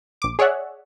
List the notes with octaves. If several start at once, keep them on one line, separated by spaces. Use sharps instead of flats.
A#1 D6
G#4 C#5 D5 E5 F#5